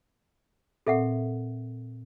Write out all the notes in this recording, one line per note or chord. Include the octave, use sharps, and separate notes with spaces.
A#2 C4 A4 E5 F#5